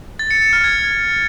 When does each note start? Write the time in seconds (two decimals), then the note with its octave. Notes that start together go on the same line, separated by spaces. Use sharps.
0.19 A6
0.31 C#7
0.42 C#7
0.53 F6
0.64 G#6